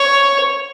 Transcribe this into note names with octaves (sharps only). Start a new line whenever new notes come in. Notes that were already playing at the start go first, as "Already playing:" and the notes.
Already playing: C#5